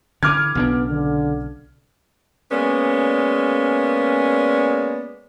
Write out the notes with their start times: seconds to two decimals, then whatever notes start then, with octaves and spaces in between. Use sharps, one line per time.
0.23 D3 E3 D6 F6 G#6
0.55 B1 C#3 B3 D4
0.89 D3
2.51 G#3 A#3 B3 C#4 D5